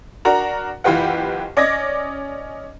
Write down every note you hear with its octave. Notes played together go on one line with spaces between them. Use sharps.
D4 F#4 A#4 A#5
F#1 E3 F4 G4 B4 F#5
C#4 D5 D#5 D6 G#6 A#6